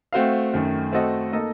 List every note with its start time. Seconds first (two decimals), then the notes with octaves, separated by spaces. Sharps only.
0.13 A3 C4 F#4 C5 F5
0.53 F#2 D#3 A3
0.92 A3 C4 F#4 A4 D#5
1.32 A#3 D#4 A4 D#5